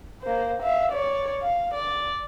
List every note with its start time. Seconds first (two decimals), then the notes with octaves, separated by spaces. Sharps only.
0.22 A#3 C5
0.63 E5 F5
0.92 C#5 D5
1.42 F5
1.74 D5